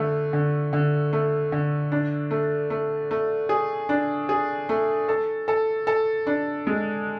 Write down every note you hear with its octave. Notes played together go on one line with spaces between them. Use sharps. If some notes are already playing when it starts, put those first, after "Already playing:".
Already playing: D3 A3
D3
D3
A3
D3
D4
A3
A3
A3
G#4
D4
G#4
A3
A4
A4
A4
D4
G#3